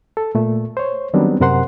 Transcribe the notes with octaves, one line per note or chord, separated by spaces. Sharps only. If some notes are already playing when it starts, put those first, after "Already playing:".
A4
A#2 A3
C5 C#5
D#3 F#3 G3 B3 C4 D4
F#2 C3 A#4 C5 F#5 C6